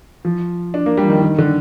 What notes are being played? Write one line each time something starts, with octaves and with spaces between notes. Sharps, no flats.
F3
D4
A#3
G3
F3
D#3
D#3
D3